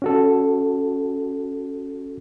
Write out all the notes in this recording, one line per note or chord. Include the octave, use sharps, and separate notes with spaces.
C#4 F#4 A4